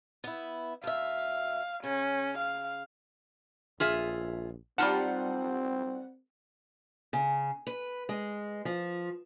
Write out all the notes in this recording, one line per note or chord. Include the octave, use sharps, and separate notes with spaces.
B3 E4
D2 E5 F5
C#3 C#4
F5
A#1 F4 G#4 E5
G3 C4 D#4 F4 F#5 A5
C#3
B4
G#3
F3